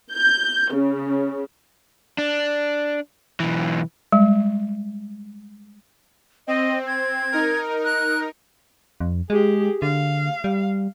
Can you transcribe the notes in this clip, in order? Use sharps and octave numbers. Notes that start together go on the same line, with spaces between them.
G6
C#3
D4
B1 E3
G3 G#3
C4 D#5
G#6
D#4 A#4
F#6
F2
G#3 G4 G#4
D3 F5
G3